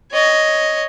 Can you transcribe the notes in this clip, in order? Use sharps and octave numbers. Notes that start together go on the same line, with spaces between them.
C#5 D#5